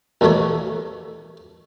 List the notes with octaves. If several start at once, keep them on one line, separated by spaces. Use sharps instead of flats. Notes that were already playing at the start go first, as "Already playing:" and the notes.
A1 D#2 B2 A3 A4 C#5